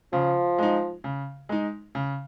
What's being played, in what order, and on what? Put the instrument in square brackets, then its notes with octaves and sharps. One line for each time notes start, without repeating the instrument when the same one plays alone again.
[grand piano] C#3 [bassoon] F3
[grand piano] G#3 D#4
C#3
G#3 D#4
C#3